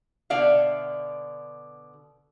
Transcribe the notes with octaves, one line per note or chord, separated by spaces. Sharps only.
B2 D3 D5 E5 F5